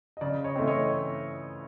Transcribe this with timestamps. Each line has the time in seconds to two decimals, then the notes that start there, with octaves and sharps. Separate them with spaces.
0.17 D#5
0.21 C#3 D5
0.44 C#5 D#5
0.56 E3 A3 C4
0.67 C#5 D#5